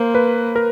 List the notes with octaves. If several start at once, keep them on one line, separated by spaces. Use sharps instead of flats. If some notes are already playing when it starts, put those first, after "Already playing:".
Already playing: A#3 C5
B4
A#4